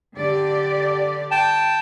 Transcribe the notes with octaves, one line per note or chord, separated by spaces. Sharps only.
D3 G4 D5
G5 A5